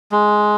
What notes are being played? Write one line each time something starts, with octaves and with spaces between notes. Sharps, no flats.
G#3